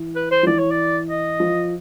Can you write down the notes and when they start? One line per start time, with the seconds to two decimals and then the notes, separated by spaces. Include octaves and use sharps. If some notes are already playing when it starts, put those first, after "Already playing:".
Already playing: E3
0.16 B4
0.31 C5
0.43 F3
0.46 E3 D5
0.59 C#5
0.71 D5
1.09 D#5
1.40 F3